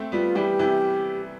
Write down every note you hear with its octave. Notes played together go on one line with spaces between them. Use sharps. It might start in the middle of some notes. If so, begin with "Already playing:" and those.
Already playing: A3 C4
G3 B3 F4
E3 G3 G4
C3 E3